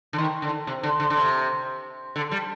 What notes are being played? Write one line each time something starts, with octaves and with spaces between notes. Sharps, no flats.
D3
D#3
D3
C3
D3
D3
D3
C3
D3
G3